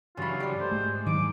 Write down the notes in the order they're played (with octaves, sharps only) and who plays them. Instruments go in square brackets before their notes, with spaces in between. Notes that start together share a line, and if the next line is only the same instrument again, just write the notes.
[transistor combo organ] G2 C#3 F#3 [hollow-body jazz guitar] E3 B5 [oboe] F4
[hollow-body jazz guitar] G4 D5
[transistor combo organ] A3 [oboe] C5
[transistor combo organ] G#2 [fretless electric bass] A3
[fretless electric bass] D#3 F#3 G3 [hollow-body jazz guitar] D#4 [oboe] D6